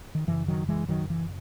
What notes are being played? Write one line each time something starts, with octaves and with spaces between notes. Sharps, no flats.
D#3
F#2 C#3 E3
D#3 F#3
E3 G#3
D#3 F#3
E3